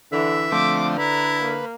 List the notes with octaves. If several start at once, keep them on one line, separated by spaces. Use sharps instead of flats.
D3 E3 E5
D3 F3 A3 C4 D6
E4 B4 A#5
A#3